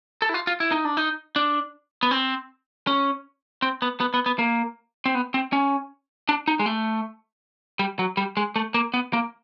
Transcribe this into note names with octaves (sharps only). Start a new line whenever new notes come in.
A4
E4
F4
F4
E4
D#4
D4
D#4
D4
B3
C4
C#4
C4
B3
B3
B3
B3
A#3
C4
B3
C4
C#4
D4
D#4
G#3
A3
G3
F#3
G3
G#3
A3
A#3
B3
A#3